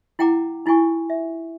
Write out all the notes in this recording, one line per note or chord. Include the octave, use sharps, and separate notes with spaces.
E4 F#5 G5 A#5 D6
D#4 E4 F#4 G#5 C#6
E5